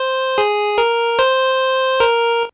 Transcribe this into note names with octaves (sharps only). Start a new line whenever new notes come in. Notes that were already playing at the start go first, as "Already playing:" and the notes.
Already playing: C5
G#4
A#4
C5
A#4